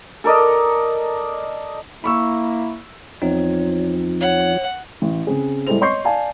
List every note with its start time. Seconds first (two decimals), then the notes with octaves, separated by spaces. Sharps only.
0.24 A4 A#4 D5 D#5
2.04 A#3 E4 B5 C#6 E6
3.22 E2 F3 C4 D#4 C#5
4.21 C#5 F#5
5.02 A1
5.27 C#3 C4 G#4
5.67 A2 G3 G#3 A4 C5 F7
5.81 C#5 D#5 C6 C#6 G6 C7
6.05 D5 F5 G#5 A5